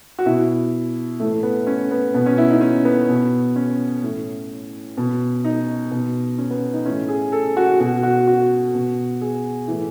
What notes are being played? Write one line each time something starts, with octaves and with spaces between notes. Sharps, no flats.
F#4
B2 E4
A2 E3 A3
B3
C#4
B3
B2 B3
C#4
E4
D#4
C#4
B3
B2
C#4
A2 E3
B2
D#4
B2
C#4
B3
D#4
A2 E3 C#4
G#4
A4
F#4
B2 F#4
F#4
F#4
B2
G#4
A2 E3